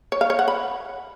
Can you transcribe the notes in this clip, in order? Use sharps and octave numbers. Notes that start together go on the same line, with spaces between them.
C#5
F5
C#5
F#5
B5